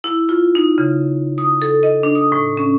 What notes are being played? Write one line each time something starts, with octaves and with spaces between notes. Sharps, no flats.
E4
F4
D#4
C#3
D#6
A4
D#5
D4
D#6
A2
C#4